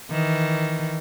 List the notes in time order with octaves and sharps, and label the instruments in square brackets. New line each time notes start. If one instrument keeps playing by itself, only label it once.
[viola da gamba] D#3 E3